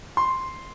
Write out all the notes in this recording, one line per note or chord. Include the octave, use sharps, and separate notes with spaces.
C6